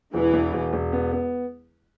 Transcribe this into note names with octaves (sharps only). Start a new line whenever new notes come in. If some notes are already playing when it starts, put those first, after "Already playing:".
E1 E3
E1
E1
E1
B3
B3